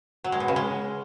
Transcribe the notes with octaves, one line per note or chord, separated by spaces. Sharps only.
F#3
G#3
B2
C#3
G#3